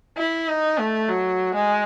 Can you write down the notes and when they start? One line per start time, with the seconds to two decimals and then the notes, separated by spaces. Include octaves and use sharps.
0.17 E4
0.48 D#4
0.79 A3
1.09 F#3
1.55 G#3